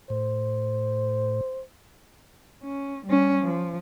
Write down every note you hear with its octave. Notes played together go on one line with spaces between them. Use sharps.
A2 C5
C#4
G3 C#4
F3